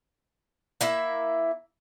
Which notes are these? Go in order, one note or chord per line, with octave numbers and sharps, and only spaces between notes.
A#3 E4 E5